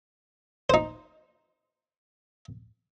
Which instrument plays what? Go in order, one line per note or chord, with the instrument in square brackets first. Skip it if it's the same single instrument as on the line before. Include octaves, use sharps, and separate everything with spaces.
[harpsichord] D#4 C5